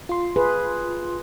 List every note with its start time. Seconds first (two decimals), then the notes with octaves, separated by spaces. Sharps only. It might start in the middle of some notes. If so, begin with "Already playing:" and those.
0.09 F4 C6
0.36 G#4 B4